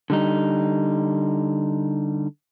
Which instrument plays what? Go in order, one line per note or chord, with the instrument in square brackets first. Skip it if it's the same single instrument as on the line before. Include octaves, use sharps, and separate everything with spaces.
[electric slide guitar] D3 G3 D#4